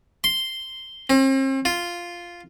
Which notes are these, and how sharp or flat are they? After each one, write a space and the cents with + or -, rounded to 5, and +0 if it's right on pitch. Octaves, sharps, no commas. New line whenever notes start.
C6 -5
C4 +40
F4 -5